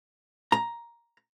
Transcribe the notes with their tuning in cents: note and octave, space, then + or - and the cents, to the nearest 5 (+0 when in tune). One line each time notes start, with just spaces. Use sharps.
A#5 +10